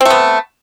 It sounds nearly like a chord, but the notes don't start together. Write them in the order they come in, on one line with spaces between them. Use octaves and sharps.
C4 A3 B3